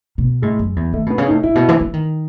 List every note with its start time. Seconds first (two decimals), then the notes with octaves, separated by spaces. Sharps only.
0.18 B2
0.42 A2 G#3
0.59 F#2
0.76 E2
0.93 D#3 A3
1.06 B2 B3
1.18 C#3
1.27 D#4
1.30 A2
1.43 A2 E4
1.55 B2
1.69 E3
1.81 E3
1.94 D#3